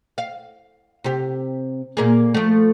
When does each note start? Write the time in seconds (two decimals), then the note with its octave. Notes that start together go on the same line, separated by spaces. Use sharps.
0.18 F5
1.04 C3 G4
1.97 A#2 A#3 G#4
2.34 F3 A3